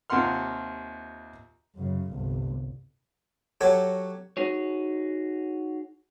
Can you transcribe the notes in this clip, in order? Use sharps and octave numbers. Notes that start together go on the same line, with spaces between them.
D#2 C3 F4 F#5 C6 F6
F#2 C#3
G1 C2
F#3 F#4 G4 A4 C#5
D#4 F#4 G#4 C#5